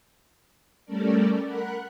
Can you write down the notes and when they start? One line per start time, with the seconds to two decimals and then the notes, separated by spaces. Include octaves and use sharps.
0.85 G3 A3 C#4 A4 A#4 D5
1.45 A#4 F#5 B5 F#6